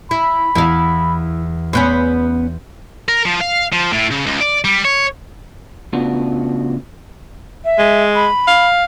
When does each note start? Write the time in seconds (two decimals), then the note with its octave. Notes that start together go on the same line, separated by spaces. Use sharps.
0.11 E4 B5
0.55 E2 E4 F5
1.73 E2 B3 C#4 B4 C6 G6
3.08 A#4
3.25 F3
3.41 F5
3.72 F3
3.93 A2
4.11 C#3
4.26 C#2
4.41 D5
4.64 G3
4.85 C#5
5.93 C#3 A3 B3 D4 F4 F#4
7.64 E5
7.78 G#3
8.15 B5
8.47 F5